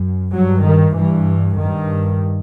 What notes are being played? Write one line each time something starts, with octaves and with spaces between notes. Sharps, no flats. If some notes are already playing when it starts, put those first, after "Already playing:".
Already playing: F#2
G2 F#3
D#3
G2 E3
G2 D#3